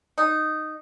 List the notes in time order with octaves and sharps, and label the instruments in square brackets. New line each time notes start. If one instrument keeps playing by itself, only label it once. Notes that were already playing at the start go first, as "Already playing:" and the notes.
[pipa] D#4